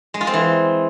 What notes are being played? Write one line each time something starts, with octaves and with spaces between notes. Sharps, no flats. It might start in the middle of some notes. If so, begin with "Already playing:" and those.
G#3
F4
C4
E3